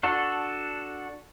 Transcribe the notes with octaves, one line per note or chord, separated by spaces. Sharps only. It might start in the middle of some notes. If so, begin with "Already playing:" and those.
D4 F#4 A4